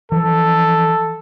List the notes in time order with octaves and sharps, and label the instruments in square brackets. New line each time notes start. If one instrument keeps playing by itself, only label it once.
[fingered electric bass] E3 F3 [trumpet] A4